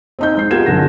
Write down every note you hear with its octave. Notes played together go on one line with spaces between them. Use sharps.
C4 D#4 G6
G#3 C7
B3 F4 G4 A#4 G#6 E7
B1 D3 G#4 F#5 A#6